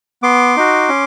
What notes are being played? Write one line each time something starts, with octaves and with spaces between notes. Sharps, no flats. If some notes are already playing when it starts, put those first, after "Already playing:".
B3 C6 D6
D#4 F#4
C#4